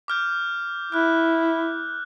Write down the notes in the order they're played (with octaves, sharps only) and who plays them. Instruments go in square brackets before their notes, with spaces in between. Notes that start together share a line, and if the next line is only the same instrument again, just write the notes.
[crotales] D6 F6 G6
[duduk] E4 [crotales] F6 F#6